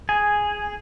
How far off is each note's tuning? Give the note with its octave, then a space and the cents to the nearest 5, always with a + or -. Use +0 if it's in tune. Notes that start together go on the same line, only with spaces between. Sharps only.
G#4 +0 G#5 +0